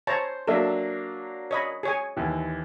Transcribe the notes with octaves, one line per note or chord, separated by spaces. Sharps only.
C5 C#5 A5 A#5
F#3 A#3 D4 A4 E5
C#5 D#5 B5
G#4 C#5 G#5
D#2 E3